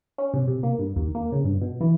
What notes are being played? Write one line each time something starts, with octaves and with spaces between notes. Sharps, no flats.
C#4
C3
C3
A#3
G2
D#2
A#3
C#3
G2
B2
E3